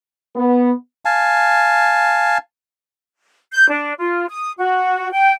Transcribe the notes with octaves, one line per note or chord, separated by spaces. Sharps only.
B3
F5 G#5 A5
G6
D4
F4
D#6
F#4
G5